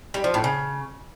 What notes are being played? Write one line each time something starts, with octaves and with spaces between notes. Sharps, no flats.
G3
F3
A2
C#3